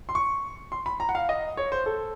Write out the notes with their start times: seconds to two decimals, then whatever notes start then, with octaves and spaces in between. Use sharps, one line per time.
0.09 C6
0.15 C#6
0.72 C6
0.86 B5
1.00 A#5
1.09 F#5
1.15 F5
1.29 D#5
1.57 C#5
1.72 C5
1.86 A4